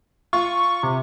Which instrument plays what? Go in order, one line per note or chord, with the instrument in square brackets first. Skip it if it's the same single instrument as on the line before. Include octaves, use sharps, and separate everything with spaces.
[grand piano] F4 [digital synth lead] C#6
[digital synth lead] C3